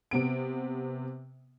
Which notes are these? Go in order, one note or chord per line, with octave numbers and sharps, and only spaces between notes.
C3 B3 D7